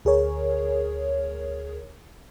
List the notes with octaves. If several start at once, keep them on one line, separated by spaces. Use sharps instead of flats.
D2 G#4 A#4 C#5